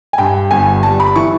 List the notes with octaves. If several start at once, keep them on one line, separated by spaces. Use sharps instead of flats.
G#5
G2 G5
G1 G#5
G3 A5
B5
E3 C#6